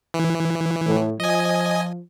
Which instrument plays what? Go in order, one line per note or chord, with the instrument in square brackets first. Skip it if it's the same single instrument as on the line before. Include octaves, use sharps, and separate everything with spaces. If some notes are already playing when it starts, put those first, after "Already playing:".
[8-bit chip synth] E3
[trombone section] A2
[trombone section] F3 [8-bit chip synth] D#5 G#5